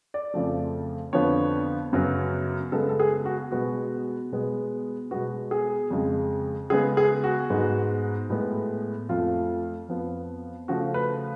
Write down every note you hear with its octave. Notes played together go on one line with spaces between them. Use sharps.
D5
F2 C#3 F3 A3
F2 D3 F3 B3 C#5
F#2 C#3 F#3 B3
C#3 G#3 B3 A4
A4
G#4
F#4
B2 G#3 B3 F#4
B2 G#3 B3
B2 G#3 B3 F#4
G#4
F2 C#3 G#3
C#3 G#3 B3 G#4
G#4
F#4
G#2 G#3 B3
A2 G#3 B3
F2 F3 A3 F4
F2 F3 B3
C#3 F3 A3 F#4
B4